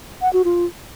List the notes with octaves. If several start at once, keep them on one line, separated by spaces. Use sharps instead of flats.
F#5
F#4
F4